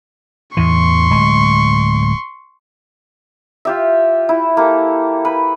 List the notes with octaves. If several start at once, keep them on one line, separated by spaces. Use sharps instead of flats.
E2 A2 E3 C6 C#6
D1 G#3
F4 G4 E5
E4
A#3 G4 A4
B4